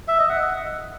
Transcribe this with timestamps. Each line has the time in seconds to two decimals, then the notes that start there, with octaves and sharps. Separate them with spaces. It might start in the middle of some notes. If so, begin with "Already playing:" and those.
0.08 E5
0.19 D#5
0.29 F#5